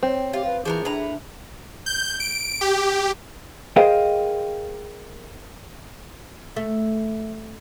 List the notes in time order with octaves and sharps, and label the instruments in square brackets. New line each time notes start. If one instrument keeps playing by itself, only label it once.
[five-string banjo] C4 [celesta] C#5 G5
[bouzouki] F4 [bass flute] G4
[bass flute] B4 [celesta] F5
[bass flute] E3 [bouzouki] F3 B3 A#4 [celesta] G#4
[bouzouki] A2 B4 A#5 [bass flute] D4
[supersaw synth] G6
D7
G4
[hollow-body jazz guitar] G#4 A#4 C5 D#5 F5 G5
[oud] A3